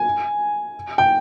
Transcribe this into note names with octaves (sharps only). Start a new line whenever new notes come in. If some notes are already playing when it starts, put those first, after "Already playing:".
Already playing: G#5
G5